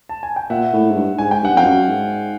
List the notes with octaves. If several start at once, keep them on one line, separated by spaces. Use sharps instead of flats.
A5
G#5
G5
A#2 E5 F#5
A2
G#2
G2
G#2 G#5
G5
G2 F#5
F2 F5 G5
F#2
G#2